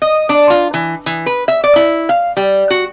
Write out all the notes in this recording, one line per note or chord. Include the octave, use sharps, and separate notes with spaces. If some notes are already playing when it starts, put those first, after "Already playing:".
D#5
D4
F4
E3
E3
B4
E5
D5
E4
F5
G3
F#4